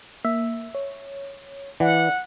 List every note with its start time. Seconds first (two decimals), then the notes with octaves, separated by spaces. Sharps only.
0.25 A#3 E5
0.75 C#5
1.80 E3 D5 F#5